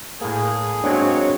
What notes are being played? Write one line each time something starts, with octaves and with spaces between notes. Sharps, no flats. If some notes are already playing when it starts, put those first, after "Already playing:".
A2 A#3 G#4
F#3 G#3 A#3 C4 D4 C#5